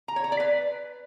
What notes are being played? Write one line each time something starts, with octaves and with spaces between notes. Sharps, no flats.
A#5
C#5
A#5
D5
B4